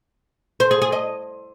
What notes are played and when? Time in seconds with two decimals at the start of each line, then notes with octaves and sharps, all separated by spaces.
0.60 C5
0.71 G#4
0.82 G#4
0.92 D#5